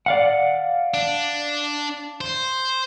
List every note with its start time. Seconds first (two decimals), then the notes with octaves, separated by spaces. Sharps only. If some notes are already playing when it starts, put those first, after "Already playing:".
0.06 D5 F5 F#5
0.94 D4
2.21 C5